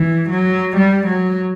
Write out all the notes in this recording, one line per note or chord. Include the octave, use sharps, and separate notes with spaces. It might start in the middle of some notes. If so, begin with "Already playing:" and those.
Already playing: E3
F#3
G3
F#3